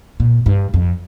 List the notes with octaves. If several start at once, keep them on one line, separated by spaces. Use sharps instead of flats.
A#2
G2
F2